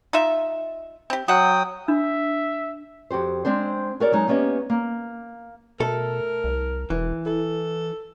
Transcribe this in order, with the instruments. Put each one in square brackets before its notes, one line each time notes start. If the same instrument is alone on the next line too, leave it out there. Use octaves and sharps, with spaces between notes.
[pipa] D#4 F4 E5
C4 G4
[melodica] F#3 G5 D#6 [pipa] F#4 F#5
[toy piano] D4 [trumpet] E5
[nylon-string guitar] F2 F#4 G4 C5
G#3 C4 D4 C5
F#4 G#4 A#4 C#5 D5
F#3 G#3 D#4
A#3 B3 C#4 G4 D#5
A#3
[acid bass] B2 [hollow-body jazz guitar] A3 A4 [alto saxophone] A#4
[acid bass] C2
[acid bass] E1 [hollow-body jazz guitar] E3
[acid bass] E4 [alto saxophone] A4